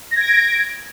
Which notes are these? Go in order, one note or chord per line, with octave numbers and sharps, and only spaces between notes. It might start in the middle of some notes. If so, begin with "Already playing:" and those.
G#6 A#6 D7